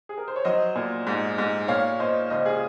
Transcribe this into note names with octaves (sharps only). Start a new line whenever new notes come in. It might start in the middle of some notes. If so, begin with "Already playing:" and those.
G#4
A#4
C5
C#5
F#3 C5 D#5
A#2
G#2
G#2
A#2 C#5 F5
A#2 C5 D#5
C#2 C5 D#5
F4 G#4